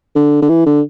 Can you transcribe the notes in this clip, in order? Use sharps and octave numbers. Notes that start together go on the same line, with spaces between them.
D3
D3
E3
D3